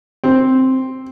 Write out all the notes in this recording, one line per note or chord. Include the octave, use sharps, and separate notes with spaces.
C4